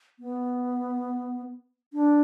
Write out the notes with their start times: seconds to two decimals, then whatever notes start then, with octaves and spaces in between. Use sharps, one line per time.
0.19 B3
1.93 D4